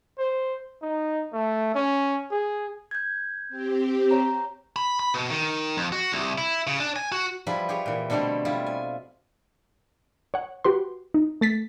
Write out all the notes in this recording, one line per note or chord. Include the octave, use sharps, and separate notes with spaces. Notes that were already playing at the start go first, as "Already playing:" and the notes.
C5
D#4
A3
C#4
G#4
G6 G#6
C4 G4
C#5 A#5
B5
B5
B2
D#3
F2
F#4
C2
E4
C#3
D4
G#5
F#4
F3 G3 E4 G#4 B4
G4 G#4 C#5
A#2 E3
B2 D3 G3 A3 B3 C4
G3 E4 F4
G#5
C#5 F#5
F#4 G4 B4 C6
D#4
A3 A6 B6